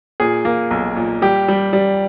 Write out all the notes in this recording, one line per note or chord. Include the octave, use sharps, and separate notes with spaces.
A#2 G#4
A#3
B1
A#2
G3 G4
G3
G3